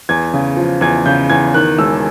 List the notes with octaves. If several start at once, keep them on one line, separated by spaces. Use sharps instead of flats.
E2 G#6
C#3
F3
E2 G#6
C#3 G6
E2 G#6
D#3 F#6
E1 E6